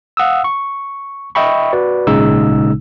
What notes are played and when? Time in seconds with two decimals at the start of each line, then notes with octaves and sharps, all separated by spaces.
0.17 F5 F#5 D#6 E6
0.44 C#6
1.35 D#5 E5 G5 B5 C#6
1.73 F#4 B4 D5
2.07 G#1 A#2 C#3 G#3 D#4 E6